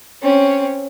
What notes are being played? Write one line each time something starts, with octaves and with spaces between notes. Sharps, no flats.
C4 C#4